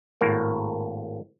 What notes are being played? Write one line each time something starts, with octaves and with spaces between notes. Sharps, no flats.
G#1 A2 A#3 A#4